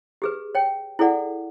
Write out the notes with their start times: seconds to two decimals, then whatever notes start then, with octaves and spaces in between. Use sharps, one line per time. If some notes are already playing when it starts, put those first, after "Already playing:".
0.22 G4 G#4 B4
0.55 C#5 G5
0.99 E4 G#4 A4 D5 F#5